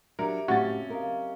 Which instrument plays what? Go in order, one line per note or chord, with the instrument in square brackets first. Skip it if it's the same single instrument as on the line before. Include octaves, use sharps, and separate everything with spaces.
[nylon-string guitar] F#3 D4 [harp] G4 E5 [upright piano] A#4
[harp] F#1 C4 [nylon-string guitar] A2 G4 [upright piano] C#4 A6 [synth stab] F#4
[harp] G4 D#5 F5 [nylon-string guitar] A#4